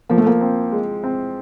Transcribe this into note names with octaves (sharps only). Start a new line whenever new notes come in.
F3 A#3
A3
A#3
C4
G#3
C4